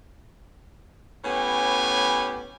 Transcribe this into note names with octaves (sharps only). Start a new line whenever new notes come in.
A2 B3 C#4 G4 G#5